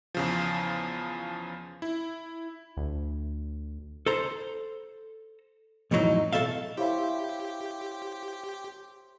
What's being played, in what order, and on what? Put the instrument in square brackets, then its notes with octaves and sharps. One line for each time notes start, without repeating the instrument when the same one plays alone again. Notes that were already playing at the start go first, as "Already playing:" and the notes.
[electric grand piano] E2 C#3 F3
E4
[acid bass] D2
[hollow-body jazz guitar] A4 C5 A#5
F2 A2 E3 F#3 D#4
B1 A#2 A4 E5 F5
[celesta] E4 F5 B5 [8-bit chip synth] G4 [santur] C5 C#5 E5